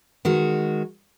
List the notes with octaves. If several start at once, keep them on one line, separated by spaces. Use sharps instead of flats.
D#3 G#3 F#4